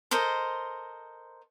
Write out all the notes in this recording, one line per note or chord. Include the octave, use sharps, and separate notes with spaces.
A4 A#4 C5 D#5